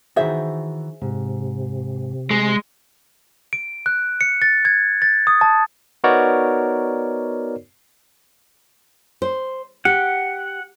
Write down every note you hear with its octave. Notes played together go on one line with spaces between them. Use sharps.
D#3 E3 F#4 G#4 C5 E5
G#2 C3
G#3
D7
F#6
C#7
A6
G#6
A6
D#6
A5
B3 D#4 F#4 A#4 C#5 D5
C5
G4 F#5